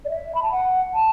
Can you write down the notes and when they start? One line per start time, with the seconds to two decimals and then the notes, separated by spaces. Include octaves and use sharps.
0.05 D5
0.10 E5
0.35 B5
0.42 A5
0.51 F#5
0.94 A5